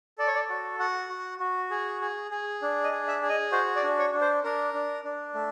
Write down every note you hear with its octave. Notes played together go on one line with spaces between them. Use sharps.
A4 D5
C#5
D5
F#4
F#4 F#5
F#4
F#4
G#4
G#4
G#4
D4
D#5
G#4
E5
G#4
D#5
F#4 C5
D5
D4
C#5
D4
C5
D4 A#4
D4
D4
A3